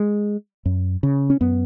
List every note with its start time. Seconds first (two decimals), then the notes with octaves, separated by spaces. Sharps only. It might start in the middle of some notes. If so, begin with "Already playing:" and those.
Already playing: G#3
0.66 F#2
1.03 C#3
1.30 C#4
1.41 F#2 B3